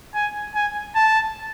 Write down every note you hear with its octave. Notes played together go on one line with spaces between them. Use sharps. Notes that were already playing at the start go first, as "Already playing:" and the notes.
G#5
G#5
A5